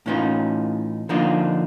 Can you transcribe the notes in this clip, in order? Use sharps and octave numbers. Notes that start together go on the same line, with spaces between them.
A2 E3 C#4 D#4 F4
D3 F3 A#3 D4 D#4 F4